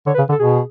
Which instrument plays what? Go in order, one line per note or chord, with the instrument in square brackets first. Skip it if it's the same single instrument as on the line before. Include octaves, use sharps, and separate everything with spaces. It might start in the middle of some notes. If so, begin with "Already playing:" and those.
[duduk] D3 [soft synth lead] C#5
[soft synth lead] B4
[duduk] C#3
D3
[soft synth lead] A4
[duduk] B2 [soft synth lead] G#4